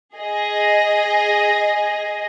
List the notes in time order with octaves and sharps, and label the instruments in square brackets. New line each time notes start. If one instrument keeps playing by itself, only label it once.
[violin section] G#4 D#5